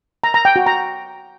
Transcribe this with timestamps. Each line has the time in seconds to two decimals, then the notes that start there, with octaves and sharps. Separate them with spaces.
0.24 A#5
0.34 A#5
0.45 G5
0.56 F#4
0.66 A#5